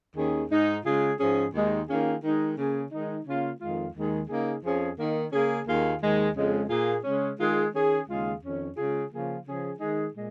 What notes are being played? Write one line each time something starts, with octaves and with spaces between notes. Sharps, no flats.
D#2 D#3 C#4 G#4
G#2 G#3 D#4
C#3 G#3 F4 G#4
G#2 F3 C#4 G#4
D#2 D#3 G#3 D#4
D#3 A#3 C#4 F4 G#4
D#3 G#3 D#4
C#3 A#3 C#4 G#4
D#3 G#3 D#4
C#3 A#3 C#4 F4
F2 D#3 G#3 F4
D#2 D#3 G#3 D#4 G#4
C#3 A#3 D#4 G#4
F2 F3 C#4 G#4
D#3 A#3 D#4
C#3 A#3 C#4 G#4
D#2 D#3 A#3 F4 G#4
D#2 D#3 G#3
F2 C#3 G#3
A#2 A#3 F4 G#4
C#3 G#3 C#4
D#3 G#3 F4 G#4
D#3 C#4 G#4
D#2 C#3 G#3 F4 G#4
F2 D#3 C#4
C#3 G#3 F4 G#4
C#3 F3 A#3 F4 G#4
C#3 F3 C#4 G#4
D#3 G#3 D#4 G#4
A#2 G#3